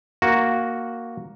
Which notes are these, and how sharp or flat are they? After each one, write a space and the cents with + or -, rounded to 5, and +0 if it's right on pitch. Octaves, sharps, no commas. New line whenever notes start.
A#3 +0 F#4 +0